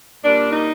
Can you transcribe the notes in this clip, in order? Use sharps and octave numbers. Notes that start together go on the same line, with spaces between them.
A#2 G3 D4
D#4